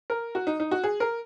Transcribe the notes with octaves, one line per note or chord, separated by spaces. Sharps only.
A#4
F#4
D#4
D#4
F#4
G#4
A#4